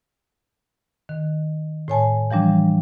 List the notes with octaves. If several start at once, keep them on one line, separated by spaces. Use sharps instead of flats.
D#3
A2 C#5 G#5 A5
E3 F3 G3 D4